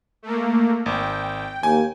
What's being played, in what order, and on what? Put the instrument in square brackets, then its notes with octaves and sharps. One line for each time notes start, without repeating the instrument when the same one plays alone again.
[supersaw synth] A3 A#3
[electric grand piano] G#1 [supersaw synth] G5
[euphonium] D#2 [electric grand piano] G#5